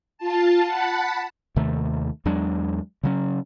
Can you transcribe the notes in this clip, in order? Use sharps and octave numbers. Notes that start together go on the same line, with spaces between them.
F4 A5
F#5 A5 B5
D#2 C3 D#3 A3
E2 F#3 G#3 D4
C#3 F#3 C#4